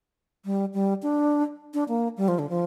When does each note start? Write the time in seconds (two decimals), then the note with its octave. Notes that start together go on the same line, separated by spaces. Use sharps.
0.45 G3
0.74 G3
1.03 D4
1.74 D4
1.88 A#3
2.17 G3
2.28 F3
2.39 D3
2.49 F3